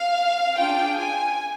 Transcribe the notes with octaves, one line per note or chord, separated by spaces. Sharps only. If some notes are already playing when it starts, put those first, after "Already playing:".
Already playing: F5
D4 F4 G#4 G5
G#5